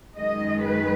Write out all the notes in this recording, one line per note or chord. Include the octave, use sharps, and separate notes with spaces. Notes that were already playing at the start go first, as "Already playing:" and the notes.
F#2 D#3 G#3 D#5
B4